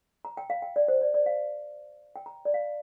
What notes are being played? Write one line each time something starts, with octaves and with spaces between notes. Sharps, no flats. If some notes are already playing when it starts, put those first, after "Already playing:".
A#5
G5
F5
G5
D5
C5
D5
D5
F5
G5
A#5
D5
F5